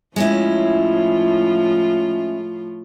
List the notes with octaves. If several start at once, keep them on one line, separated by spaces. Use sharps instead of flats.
A2 F3 G#3 C#4 E4 F4